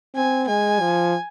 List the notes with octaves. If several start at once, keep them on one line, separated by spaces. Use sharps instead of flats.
C4 G#5
G#3 G#5
F3